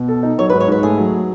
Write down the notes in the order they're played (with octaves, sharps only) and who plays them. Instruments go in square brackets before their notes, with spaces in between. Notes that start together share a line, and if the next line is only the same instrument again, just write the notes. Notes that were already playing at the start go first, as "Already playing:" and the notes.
Already playing: [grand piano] B2
A4
D#4
[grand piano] F#3 [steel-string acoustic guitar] C#5
[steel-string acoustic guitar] B4
[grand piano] G#2
[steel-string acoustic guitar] C#5
[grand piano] G#2 [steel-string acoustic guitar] B4
[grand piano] A3 [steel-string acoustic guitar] G#4
[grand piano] F#3